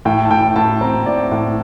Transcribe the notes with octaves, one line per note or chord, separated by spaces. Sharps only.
A2 G5
A5
A2 G5
A2 A5
C4 A#5
A2 D5
A2